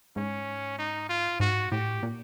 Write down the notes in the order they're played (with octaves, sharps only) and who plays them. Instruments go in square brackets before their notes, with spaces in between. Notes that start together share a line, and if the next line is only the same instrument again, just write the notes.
[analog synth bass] G#2 [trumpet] C#4
[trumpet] D#4
F4
[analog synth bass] G#2 [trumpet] F#4
[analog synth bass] A2 [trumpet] G4
[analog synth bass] A#2